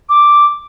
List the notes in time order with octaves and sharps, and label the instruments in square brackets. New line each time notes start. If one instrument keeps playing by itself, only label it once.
[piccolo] D6